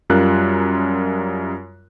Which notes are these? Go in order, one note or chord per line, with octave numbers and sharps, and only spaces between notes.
F#2 G3 F4 A#4 F#6